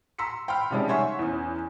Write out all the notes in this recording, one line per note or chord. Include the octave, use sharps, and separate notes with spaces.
A#5 C6 E6 B6 C#7
G5 B5 C6 F6
C3 D#3 F3 G3 G#3 C#4
C#5 E5 F#5 G#5 C6 C#6
E2 C#4